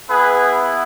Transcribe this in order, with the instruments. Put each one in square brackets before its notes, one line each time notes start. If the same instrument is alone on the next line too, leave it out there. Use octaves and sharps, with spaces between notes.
[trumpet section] B3 E4 G#4 B4